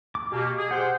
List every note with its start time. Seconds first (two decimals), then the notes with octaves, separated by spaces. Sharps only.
0.15 D6
0.32 B2 A#3 G4
0.58 G#4
0.71 C5 F#5 G5